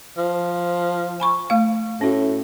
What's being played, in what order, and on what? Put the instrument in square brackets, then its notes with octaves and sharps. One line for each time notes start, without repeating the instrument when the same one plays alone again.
[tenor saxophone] F3
[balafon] G#5 B5 C#6
A3 F5
[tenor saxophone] A2 [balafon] C#4 F#4